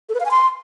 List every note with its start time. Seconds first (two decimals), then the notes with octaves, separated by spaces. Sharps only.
0.09 A4
0.15 B4
0.20 F5
0.25 G#5
0.31 C6